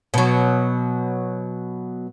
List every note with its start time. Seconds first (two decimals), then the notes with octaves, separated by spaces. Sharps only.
0.14 B2 F#3